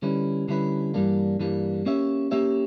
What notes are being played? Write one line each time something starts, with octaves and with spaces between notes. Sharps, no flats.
D3 G3 C#4 E4 B4
D3 G3 C#4 E4 B4
G2 E3 G3 A#3 D4
G2 E3 G3 A#3 D4
A#3 C#4 G4 C#5 E5
A#3 C#4 G4 C#5 E5